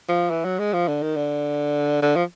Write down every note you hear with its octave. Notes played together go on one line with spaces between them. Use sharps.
F3
E3
F#3
G#3
F3
D3
D#3
D3
D3
F3